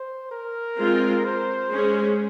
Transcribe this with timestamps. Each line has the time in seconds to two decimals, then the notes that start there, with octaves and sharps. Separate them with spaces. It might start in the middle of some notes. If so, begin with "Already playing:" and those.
Already playing: C5
0.32 A#4
0.79 G#3 C4 F4
1.25 C5
1.72 G#3 C#4 G#4